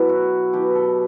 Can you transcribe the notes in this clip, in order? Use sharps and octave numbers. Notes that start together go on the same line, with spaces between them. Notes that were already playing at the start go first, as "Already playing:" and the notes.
Already playing: B2 F#3 E4
F#4
B2 F#3 G4
B4
A4